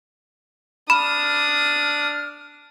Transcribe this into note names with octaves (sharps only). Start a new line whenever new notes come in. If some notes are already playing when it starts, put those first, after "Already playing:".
D4 B5 D#6 F6